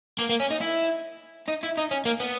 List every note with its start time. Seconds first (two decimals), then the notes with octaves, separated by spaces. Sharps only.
0.19 A#3
0.29 A#3
0.40 C#4
0.51 D#4
0.61 E4
1.48 D#4
1.63 E4
1.77 D#4
1.91 C#4
2.05 A#3
2.20 B3